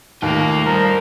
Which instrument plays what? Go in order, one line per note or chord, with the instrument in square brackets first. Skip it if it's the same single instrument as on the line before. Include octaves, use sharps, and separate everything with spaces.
[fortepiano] D#2 [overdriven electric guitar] A3 G5 [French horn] A#3
[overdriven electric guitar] G2 [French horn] F3 [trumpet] A#4